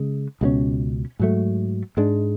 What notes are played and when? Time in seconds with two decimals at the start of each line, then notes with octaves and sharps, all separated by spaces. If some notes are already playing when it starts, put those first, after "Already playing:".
Already playing: C#3 G#3
0.41 C#2 B2 G#3 C#4
1.20 G#2 F#3 A3
1.97 G#2 G#3 D4